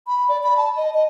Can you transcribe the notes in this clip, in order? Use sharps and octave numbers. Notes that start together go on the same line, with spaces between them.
B5
D5
B5
A5
D#5
D#5